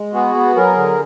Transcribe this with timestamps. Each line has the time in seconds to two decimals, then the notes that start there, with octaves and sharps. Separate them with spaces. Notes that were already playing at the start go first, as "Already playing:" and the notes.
Already playing: G#3
0.13 B3 F#4 G#4
0.35 B3
0.56 F#3 G#4 A#4
0.77 D3